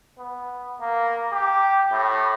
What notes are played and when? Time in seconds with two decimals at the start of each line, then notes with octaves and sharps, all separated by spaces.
0.18 B3
0.80 A#3
1.33 G4
1.92 A2